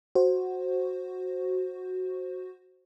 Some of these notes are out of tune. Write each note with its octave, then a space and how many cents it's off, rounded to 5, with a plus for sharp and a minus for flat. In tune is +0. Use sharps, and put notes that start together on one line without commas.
F#4 +0 C5 +10